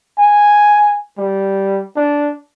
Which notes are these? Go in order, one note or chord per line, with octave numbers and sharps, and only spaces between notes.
G#5
G3
D4